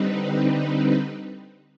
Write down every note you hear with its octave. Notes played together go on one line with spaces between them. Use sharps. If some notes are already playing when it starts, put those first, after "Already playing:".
Already playing: D3 G3 C4 D#4 B4